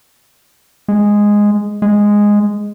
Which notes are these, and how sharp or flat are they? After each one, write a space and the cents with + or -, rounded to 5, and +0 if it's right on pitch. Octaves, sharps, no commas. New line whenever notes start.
G#3 -5
G#3 -5